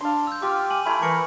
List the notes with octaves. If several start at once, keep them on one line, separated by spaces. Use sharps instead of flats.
D4 F5 C6
E6 G6
F4 G4 D6 F6
G#5 F#7
A3 E4 A#5 B5
E3 A#4 G#5 C#6 C#7